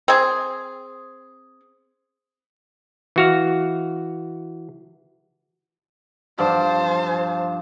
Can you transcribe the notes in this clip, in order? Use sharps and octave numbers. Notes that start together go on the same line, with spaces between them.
C4 G#4
E3 F#4 F5
G2 F3 C5 A5 D6